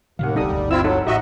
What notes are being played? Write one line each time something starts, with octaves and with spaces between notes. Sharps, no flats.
D#2 A2 C3 F3 F5 F#5
D1 B1 G3 D#4 A4 D#6
G1 D2
C4 E4 F4 E6
F#3 D#4 A4 F#5
A1 F#4 G4 D#5 E5 F#5 A#5